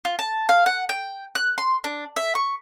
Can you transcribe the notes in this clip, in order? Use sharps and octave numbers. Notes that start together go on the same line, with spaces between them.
F4
A5
F5
F#5
G5
F#6
C6
D4
E5
C#6